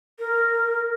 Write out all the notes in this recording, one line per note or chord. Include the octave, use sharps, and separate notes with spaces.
A#4